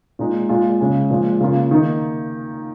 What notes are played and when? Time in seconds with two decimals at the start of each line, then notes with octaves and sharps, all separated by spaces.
0.19 A#2 G#3 D#4
0.49 A#2 G#3 F4
0.80 C#3 G#3 C#4
1.10 A#2 F3 G#3
1.40 C#3 A#3 F4
1.71 D#3 A#3 D#4